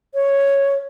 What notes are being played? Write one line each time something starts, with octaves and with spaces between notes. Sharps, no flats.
C#5